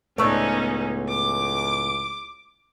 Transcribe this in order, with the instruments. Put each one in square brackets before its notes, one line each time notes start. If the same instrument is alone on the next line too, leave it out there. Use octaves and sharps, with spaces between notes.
[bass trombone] C#2 [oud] A2 B3 D5 [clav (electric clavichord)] A3 [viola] C#4 D#4
[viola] D6